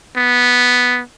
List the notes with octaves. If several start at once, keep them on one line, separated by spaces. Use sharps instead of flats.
B3